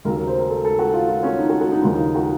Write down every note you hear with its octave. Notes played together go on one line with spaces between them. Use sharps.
D#2 C#3 F#3 A#4
A#4
C5
A#4
A4
A4
F#4
F4
F4
C#4
D#4
F#4
F#4
D#4
D#2 C#3 F3 D#4
D#4
F#4